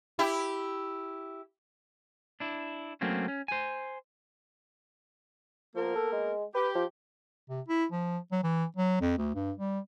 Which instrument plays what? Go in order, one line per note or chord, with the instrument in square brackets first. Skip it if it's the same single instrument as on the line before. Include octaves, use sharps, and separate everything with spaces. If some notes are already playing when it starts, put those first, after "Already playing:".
[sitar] E4 G4
[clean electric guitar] D4 E4
F#3 A3 A#3 C4 C#4
C#4
C5 G#5
[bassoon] F3 [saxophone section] A#3 B3 A#4
[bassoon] A4
G#3
[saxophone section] G4 [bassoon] B4
[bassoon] F3
[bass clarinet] C3
E4
F3
F#3
E3
F#3
F2
D2
G2
G3